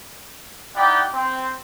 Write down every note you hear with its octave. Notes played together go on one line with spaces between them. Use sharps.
D#4 E4 G4 D5 F#5 G5
C4